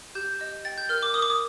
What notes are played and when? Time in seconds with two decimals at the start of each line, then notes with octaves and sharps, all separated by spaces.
0.15 G4 G6
0.41 D#5
0.65 G5 A6
0.78 G6
0.89 A#4 F6
1.03 D6
1.14 A#4 D#6
1.22 D6
1.30 D#6